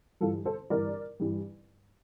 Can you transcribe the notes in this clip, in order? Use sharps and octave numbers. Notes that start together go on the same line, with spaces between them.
G2 E3 G3 F4 A4
A4 C5
G2 E3 G3 A#4 D5
G2 E3 G3